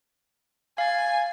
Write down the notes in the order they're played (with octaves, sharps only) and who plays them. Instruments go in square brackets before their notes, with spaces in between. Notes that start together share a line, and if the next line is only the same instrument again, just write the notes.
[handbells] F5 A6 [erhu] G#5